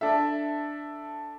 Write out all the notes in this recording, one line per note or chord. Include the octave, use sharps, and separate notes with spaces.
D4 A4 E5